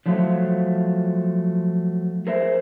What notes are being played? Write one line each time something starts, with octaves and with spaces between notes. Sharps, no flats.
F3 F#3 A3 F4
G#4 A#4 C5 D#5 E5